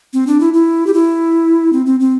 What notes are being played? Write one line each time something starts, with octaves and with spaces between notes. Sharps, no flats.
C4
D4
E4
E4
G4
E4
C4
C4
C4